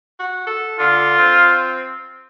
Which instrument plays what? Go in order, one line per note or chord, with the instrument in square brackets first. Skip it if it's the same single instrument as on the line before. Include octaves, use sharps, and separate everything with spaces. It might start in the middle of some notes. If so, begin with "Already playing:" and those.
[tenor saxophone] F#4
A4
[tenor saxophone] D3 [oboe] F4
[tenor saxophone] C4